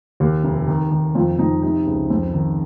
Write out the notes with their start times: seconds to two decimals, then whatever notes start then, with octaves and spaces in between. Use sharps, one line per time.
0.20 D#2
0.44 F1
0.68 D#3
0.92 D#3
1.15 F2 F4
1.39 F2 D#4
1.62 C3 D#4
1.87 C#2
2.10 F2
2.34 D#3